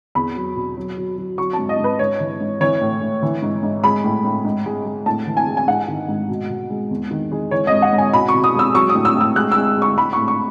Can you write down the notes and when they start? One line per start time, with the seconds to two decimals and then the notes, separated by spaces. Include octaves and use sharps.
0.15 E2 B5
0.36 F#3
0.56 B2
0.77 F#3
0.97 F#3
1.18 F#3
1.38 F#3 C#6
1.53 A5
1.59 G#2
1.69 D#5
1.79 G#2
1.84 B4
1.99 G#2 C#5
2.20 E3
2.41 G#2
2.60 E3 C#5
2.81 A2
3.02 A2
3.22 E3
3.42 G#2
3.63 G#2
3.83 G#3 B5
4.04 A2
4.25 A2
4.45 G#2
4.66 G#3
4.86 G#3
5.06 A2 A5
5.27 E3
5.37 G#5
5.47 G#3
5.57 G#5
5.68 G#2 F#5
5.88 D#3
6.09 G#2
6.29 B2
6.49 B2
6.70 G#3
6.91 E2
7.11 D#3
7.32 G#3
7.51 E3 C#5
7.67 G#2 D#5
7.82 F#5
7.93 G#2
7.98 G#5
8.13 B2 B5
8.28 C#6
8.34 B2
8.44 D#6
8.54 G#3
8.59 E6
8.75 F#3 C#6
8.90 D#6
8.95 A2
9.05 E6
9.15 A2
9.21 E6
9.36 G#3 F#6
9.52 G#3 E6
9.77 G#3 C#6
9.97 G#3 B5
10.13 A2 C#6
10.28 C#6